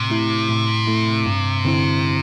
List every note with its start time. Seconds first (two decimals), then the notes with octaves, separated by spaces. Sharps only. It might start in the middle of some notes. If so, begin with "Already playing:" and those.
Already playing: A2 C3
0.10 A3 E4
0.49 A2
0.87 A3 E4
1.26 G2
1.65 D3 C4 E4